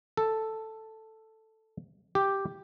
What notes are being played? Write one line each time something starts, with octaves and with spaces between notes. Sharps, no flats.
A4
G4